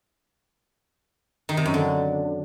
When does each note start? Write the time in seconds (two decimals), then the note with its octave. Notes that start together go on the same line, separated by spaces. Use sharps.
1.49 D#3
1.57 C3
1.65 F#2
1.74 D3